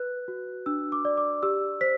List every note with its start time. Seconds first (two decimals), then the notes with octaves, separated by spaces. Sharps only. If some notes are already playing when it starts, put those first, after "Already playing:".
Already playing: B4 F#6
0.28 F#4
0.66 D4 E6
0.92 D6
1.05 D5
1.17 D6
1.43 G4 E6
1.81 C5 B6